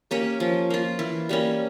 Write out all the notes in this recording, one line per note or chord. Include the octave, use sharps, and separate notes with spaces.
A#3 C#4 G4
F3
A#3 F4
E3
G3 A#3 C#4